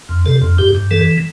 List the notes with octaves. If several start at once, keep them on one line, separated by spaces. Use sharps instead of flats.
F2
C3 A4
F2
G2 G4
G2
E3 A4